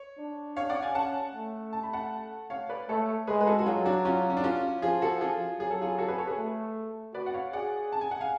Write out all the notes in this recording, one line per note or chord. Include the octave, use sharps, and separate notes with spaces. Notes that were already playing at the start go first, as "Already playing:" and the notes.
Already playing: C#5
D4
C#5 F5
D5 F#5
F5 G#5
C#4 F#5 A5
A3
A5
B5
F#5 A5
C#5 F5
B4 D5
A3 A4 C#5
G#3 G#4 B4
B4
F#4 A4
F#4
F#3 F4 G#4
D4 F#4
C#4 F4
C#4
D4
C#4 F4
F3 F4 G#4
F#4 A4
F4 G#4
F#3 G#4
A4
F4 G#4
F#4 A4
G#4 B4
A4 C#5
G#4 B4
A3
F#4 B4 D5
F#5
C#5 F5
G#4 D5 F#5
A5
G#5
F#5
F5 G#5